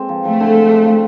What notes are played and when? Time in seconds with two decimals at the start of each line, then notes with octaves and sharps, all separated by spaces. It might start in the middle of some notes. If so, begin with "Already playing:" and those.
Already playing: G#3 C4
0.09 F3
0.25 F3 A3
0.40 D3
0.54 G#3
0.70 D4
0.86 F3